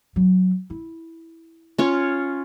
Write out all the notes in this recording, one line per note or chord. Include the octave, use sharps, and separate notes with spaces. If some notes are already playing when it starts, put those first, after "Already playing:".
F#3
E4
C#4 F4 C#5